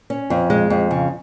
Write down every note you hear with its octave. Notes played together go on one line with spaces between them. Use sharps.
C#4
F2
G#3
F2
C#3